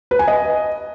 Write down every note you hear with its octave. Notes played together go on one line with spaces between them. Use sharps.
B4
G#5
D#5